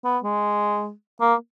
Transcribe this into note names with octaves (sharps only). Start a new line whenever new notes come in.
B3
G#3
A#3